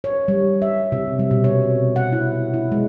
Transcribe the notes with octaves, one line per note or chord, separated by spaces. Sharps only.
C#5
G3
E5
C3
G3
B2
C#5
F#5
E4
E4
G#3